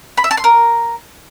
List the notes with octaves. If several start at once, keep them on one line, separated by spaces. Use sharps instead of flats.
B5
E5
A5
C6
A#4